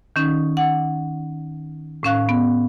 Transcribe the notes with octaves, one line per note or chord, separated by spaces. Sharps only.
D#3 C#4 D#4
F#5
A2 C#4 F5 F#6
B3